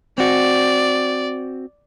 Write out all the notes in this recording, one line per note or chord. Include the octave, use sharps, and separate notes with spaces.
C4 F#4 D5